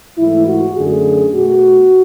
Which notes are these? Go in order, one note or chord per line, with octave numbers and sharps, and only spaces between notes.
G#2 E3 A3 E4
F#4
F#2 D3 A3 G#4
B2 A3 F#4